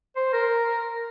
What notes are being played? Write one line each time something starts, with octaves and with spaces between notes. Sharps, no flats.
C5
A#4